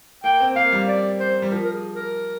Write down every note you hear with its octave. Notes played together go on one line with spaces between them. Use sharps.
A#3 G5
C4
A#3 F5
G3
D5
C5
G3
F3 A#4
A#4
G#4
A#4